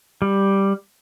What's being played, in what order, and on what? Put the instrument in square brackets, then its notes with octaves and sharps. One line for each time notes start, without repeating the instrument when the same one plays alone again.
[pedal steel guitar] G3